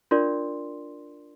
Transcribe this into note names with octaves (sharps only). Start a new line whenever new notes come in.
D4 F4 A#4 D5 C6